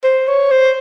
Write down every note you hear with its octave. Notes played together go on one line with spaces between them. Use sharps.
C5
C#5
C5